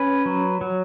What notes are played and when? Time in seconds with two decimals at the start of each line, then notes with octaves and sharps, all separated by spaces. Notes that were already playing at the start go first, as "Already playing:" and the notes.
Already playing: C#4 B4
0.26 F#3
0.61 F#3